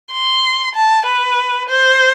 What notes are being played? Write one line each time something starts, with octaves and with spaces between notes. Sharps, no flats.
C6
A5
B4
C5